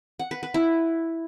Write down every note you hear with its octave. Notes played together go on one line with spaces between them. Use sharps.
F#5
B4
B4
E4